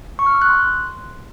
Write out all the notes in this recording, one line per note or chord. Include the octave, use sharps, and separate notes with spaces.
C#6
F6
E6
F#6
C6